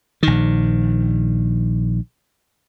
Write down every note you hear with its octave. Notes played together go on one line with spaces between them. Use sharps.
A#1 D#3